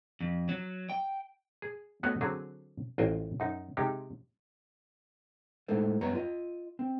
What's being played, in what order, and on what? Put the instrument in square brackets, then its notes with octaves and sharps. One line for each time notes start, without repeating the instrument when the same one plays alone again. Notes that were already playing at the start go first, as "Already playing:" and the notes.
[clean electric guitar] F2
F#3
G5
[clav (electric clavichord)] G#4
A3 B3 F#4 B4 C#5 D#5
D3 F#3 C4 G#4 C5
A1 F4 C5 D#5 G5 G#5
F#2 D#4
C3 G#3 D#4 G4
[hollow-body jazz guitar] A2 G#3 D#4 A4 C5
F#2 G3 B3 C#5 A#5
F4 D#5
C4